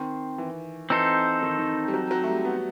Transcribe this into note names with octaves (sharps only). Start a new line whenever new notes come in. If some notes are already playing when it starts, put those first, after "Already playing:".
Already playing: D#3 C4
E3
E3 C4 D#4 A4 C5
D#3
D#3
G3
F#3
F#3
A3
G3
B3